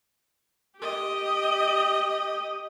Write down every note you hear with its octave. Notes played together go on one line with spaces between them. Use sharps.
G4 D#5